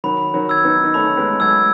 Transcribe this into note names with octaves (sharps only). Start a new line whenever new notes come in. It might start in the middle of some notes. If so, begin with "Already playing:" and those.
D#3 F#3 B5
D#3 F#3
E6 G#6
B3 D#4
D#4
A3 C#4 B5
G#3 B3
F#3 A3 E6 G#6